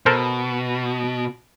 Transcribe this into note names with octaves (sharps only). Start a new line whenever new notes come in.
B2 A4 A#4 C5